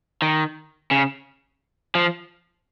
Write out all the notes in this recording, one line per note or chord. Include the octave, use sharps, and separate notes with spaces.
D#3
C#3
F3